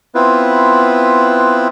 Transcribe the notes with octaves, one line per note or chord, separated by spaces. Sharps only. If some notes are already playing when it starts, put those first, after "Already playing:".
B3 C4 E4 F4 B4